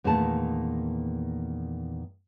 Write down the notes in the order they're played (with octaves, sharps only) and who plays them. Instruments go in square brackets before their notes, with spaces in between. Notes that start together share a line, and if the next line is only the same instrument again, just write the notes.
[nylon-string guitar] E2 A#2 D#3 A3 A5